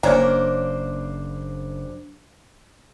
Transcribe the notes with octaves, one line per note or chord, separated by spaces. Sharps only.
F#1 A#3 D4 C5 C#5 A#5